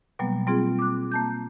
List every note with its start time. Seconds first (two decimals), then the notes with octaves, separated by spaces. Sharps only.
0.19 B2 F#3 G3 A#3 B3
0.47 G3 C4 F4 G#4
0.79 D6 F#6
1.11 A#3 A5 G6